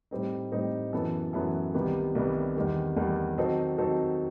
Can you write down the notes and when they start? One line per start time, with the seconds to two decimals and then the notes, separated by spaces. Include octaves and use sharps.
0.11 A2 G3 C4 D#4
0.52 A2 G3 C4 D#4
0.93 F#2 E3 B3 E4 A4
1.33 F#2 E3 B3 E4 A4
1.74 C2 C3 D#3 G3 B3
2.15 C2 C3 D#3 G3 B3
2.56 E2 D#3 G3
2.96 E2 D#3 G3
3.38 D#3 F#3 C4 D#4 A4
3.78 D#3 F#3 C4 D#4 A4